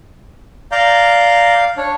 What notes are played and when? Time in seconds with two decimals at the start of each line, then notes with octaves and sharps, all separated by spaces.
0.72 D5 F5 A#5 G6
1.77 D4 C#5